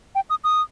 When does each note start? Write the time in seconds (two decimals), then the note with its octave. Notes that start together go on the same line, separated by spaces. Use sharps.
0.15 G5
0.30 D#6
0.44 D#6